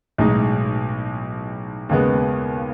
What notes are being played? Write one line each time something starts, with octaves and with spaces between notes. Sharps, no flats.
B1 A2 G#3 D#4
D#2 C#3 G#3 B3